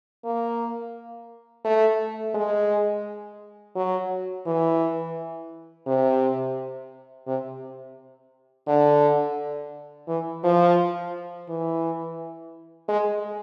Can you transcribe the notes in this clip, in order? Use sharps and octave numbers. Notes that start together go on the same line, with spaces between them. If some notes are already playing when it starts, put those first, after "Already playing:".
A#3
A3
G#3
F#3
E3
C3
C3
D3
E3
F3
E3
G#3